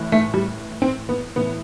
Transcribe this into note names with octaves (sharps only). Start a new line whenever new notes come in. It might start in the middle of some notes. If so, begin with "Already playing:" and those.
Already playing: A2 E3
A3
G3
C4
B3
A2 E3 B3